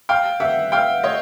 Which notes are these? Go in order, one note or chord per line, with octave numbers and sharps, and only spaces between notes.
F5 G5
E5 F#5
F5 G5
C#5 D#5